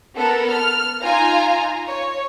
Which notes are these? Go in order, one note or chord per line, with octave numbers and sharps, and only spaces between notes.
B3 A4 A#4
F6
D#4 F4 G#5 A#5
C#5